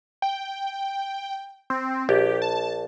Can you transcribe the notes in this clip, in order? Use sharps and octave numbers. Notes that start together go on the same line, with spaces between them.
G5
C4
A#1 G4
A5